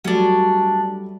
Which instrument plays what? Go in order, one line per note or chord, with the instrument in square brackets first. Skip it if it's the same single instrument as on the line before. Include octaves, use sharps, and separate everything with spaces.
[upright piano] F#3 G3 A3 [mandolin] C#4 D4